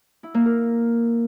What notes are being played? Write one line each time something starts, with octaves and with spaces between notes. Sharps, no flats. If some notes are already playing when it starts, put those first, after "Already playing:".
E4
A#3
A#4